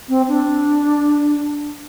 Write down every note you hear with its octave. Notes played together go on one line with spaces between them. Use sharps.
C4
D4